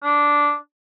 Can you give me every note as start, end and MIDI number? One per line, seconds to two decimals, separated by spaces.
0.03 0.54 62